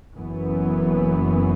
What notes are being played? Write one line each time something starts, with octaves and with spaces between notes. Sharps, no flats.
F#1 F#2 E3 B3